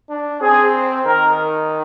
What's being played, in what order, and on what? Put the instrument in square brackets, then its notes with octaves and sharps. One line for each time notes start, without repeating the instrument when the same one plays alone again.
[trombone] D4
[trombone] C4 [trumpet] G#4
[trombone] D#3 [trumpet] A#4